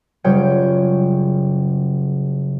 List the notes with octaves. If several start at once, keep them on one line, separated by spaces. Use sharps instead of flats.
F#1 C#3 G3 F4 C#5 G5